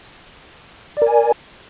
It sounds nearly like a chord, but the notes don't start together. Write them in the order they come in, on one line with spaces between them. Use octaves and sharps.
D5 A#4 G#5